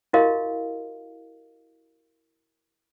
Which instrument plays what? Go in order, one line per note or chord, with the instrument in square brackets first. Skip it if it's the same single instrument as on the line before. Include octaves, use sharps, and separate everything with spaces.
[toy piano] E4 F#4 G4 A#4 D#5 F5